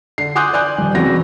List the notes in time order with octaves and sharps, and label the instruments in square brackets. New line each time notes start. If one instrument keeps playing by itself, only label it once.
[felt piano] D3 C7
G#5 C6 D6 D#6 F#6 G6
D5 G#5 F#6 G6
D#1
E1 E2 C#3 C4 F#4 A#6